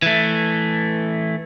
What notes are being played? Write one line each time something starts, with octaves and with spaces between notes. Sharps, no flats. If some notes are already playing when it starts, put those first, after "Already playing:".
E3 A3